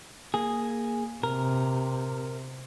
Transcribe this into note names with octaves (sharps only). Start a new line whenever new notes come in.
A#3 G#4
C3 A#4